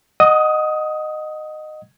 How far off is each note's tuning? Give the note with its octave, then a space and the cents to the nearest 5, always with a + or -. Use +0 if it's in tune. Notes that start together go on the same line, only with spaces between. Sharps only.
D#5 -15 F#5 +0 D#6 +15